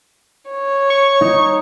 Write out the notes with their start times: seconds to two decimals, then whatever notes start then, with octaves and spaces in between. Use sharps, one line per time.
0.50 C#5
0.90 C#6
1.21 D#4